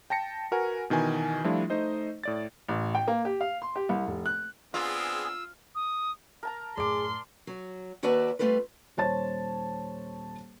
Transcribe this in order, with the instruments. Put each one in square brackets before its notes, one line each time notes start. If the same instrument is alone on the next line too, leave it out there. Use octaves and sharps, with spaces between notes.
[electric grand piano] G5 A5 A#6 C#7
F#4 A#4 B4 F#5 G#5
B2 D#3 E3 G#5
F3 G3 A3 D4 E4 F4
A3 D#4 C5 D#5
A2 D5 A6
[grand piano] A1
G5
A#3
G4
F5
C6
G4
C2
F1
F#6
[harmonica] B3 C4 D4 [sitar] F4 [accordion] G#4 [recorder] E6
[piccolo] D#6
[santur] A#4 A5 A#5
[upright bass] F#2 A2 [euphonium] G#4 [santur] D5 D6 [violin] C6
[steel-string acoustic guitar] F#3
D#2 F#4 B4 D5 E5 A5
G3 A3 C4 F4 A#4 B4
[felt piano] D#1 C5 C#5 A5 A6